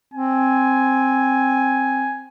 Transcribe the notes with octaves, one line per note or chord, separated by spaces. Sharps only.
C4 G#5